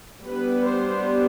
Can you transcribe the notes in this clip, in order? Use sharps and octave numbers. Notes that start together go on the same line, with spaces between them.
G3 B3 D4 B4
C5